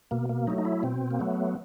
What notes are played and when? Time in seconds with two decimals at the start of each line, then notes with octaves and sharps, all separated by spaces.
0.11 B2 A#3
0.29 A#3
0.47 F#3 A3 D#4
0.58 D#4
0.65 E4
0.83 B2 C4
1.11 A#3
1.19 F#3 A3 B3